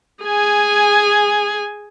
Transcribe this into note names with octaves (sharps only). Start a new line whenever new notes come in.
G#4 G#5